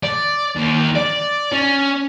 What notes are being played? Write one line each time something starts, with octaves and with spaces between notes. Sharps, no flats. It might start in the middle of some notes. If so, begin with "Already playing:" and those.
D5
D#2
D5
C#4